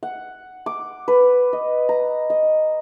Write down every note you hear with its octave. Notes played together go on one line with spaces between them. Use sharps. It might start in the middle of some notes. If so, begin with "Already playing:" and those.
F#5
D6
B4
D#5
A#5
D#5